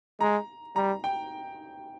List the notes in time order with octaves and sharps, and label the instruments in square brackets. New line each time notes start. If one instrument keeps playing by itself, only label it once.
[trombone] G#3 [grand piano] A#5
[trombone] G3 [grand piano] A#5
[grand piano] G5